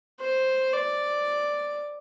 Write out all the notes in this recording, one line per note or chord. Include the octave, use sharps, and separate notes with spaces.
C5
D5